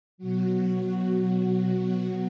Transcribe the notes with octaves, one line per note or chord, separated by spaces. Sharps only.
B2 F#3 F#4